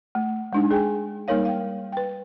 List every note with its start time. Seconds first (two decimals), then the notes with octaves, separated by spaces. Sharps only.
0.15 A3
0.53 G#3 D4 D#4
0.71 G#4 G5 G#5
1.28 G3 A#3 D#4 A#4 C#5 F5
1.45 F5 G5
1.92 B4 G5